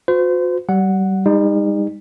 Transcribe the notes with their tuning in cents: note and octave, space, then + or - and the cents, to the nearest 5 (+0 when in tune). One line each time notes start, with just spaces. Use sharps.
F#4 -45 C5 -40
G3 -30 F#5 -5
G3 +45 D#4 +0